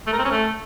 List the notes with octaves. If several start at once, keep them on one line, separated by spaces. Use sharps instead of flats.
A3
A#4
C4
C#4
A3